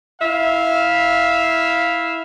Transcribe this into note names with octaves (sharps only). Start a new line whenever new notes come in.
E4 E5 F5